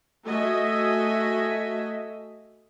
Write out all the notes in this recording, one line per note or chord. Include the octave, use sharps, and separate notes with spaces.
A3 F#4 D#5 E5 G#5